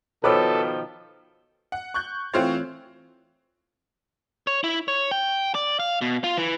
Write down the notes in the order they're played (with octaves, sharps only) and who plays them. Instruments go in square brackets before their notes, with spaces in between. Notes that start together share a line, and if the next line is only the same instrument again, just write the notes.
[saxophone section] B2 D#3 F3 [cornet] A4 [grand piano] B4 D6 E6 [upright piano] C#5
[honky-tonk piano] F#5
C#6 F#6 G6
E3 A3 C4 F4 C5 C#5
[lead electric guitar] C#5
E4
C#5
G5
D5
F5
B2
F4
E3